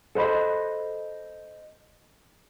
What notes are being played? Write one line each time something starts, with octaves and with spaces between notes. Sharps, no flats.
A4 C5 D#5 B5